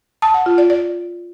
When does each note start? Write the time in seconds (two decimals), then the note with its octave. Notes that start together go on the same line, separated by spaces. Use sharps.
0.22 A5
0.34 F#5
0.46 F4
0.58 D5
0.70 D5